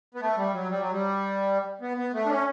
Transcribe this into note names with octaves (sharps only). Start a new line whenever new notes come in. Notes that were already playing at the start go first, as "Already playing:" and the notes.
B3
A3
G3
F#3
G3
F#3
G3
B3
B3
A3
D4
C#4